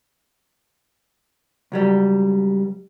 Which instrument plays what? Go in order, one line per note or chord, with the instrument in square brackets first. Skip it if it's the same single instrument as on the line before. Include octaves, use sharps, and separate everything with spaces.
[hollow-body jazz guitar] C#2 F#3 G3